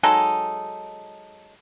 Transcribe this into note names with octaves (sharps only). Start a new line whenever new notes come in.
F#3 G#3 D#4 A4